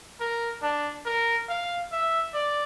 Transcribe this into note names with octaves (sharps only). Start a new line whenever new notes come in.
A#4
D4
A#4
F5
E5
D5